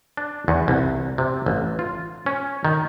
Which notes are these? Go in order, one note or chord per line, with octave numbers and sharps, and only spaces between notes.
D4
E2
C2
C3
A1
F4
C#4
D#3